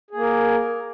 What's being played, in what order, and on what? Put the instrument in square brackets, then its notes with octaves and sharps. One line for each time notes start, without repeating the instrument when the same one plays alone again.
[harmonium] G#4
A#3
A#4